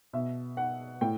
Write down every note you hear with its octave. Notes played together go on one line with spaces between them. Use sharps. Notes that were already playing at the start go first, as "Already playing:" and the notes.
B2 E5
F#5
A2 G5